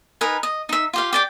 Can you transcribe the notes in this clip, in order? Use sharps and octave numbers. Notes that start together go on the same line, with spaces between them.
D#4 A#4 B4 G#5
D#5
D#4 E5
F4 G4 F5
G4 D5 G5